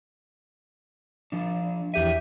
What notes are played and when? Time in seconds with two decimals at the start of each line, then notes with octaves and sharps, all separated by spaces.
1.32 F3 D4
1.94 E2 G4 E5 D#7